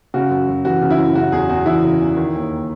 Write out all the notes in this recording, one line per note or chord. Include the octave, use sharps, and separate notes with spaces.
C#3 F#4
F#2
F#2
E3 F#4
C#3
E4
F#2
C#3 F#4
E2 G#4
E2 F#4
E3 E4
C#3
E2
D#3
D#2